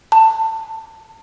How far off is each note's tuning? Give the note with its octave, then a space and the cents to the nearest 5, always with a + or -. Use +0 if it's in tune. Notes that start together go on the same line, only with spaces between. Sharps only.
A5 +20